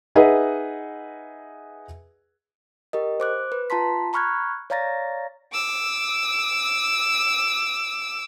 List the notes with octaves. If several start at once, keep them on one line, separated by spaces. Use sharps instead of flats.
D#4 G#4 B4 D#5 E5 F#5
G4 A#4 D#5
C5 D6 F#6
B4
F4 A5 A#5 C6 B6
A#5 B5 C#6 F6 F#6 G#6
C#5 D5 F5 A#5 A6 A#6
D6 E6